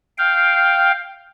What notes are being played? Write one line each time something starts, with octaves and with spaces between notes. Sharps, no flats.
F5 G5